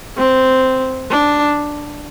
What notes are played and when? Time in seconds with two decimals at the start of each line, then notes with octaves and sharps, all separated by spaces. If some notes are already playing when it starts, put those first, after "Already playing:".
0.17 C4
1.10 D4